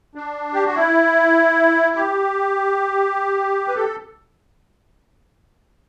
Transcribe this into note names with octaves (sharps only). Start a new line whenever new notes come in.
D4
G4
F#4
E4
G4
B4
A4